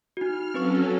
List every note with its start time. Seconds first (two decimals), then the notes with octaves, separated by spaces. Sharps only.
0.17 D#4 F#4 F6
0.54 F#3 C4 C#4 A4 B4 C#6